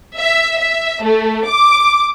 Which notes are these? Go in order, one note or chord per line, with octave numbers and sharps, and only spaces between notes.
E5
E5
A3
D6